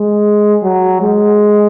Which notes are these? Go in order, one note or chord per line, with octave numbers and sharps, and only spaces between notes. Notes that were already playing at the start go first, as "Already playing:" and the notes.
Already playing: G#3
F#3
G#3